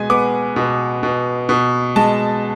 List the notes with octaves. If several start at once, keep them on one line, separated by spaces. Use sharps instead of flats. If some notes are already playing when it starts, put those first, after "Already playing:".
Already playing: B2 G#3 G#5
B3 D6
B2
B2
B2
G#3 A5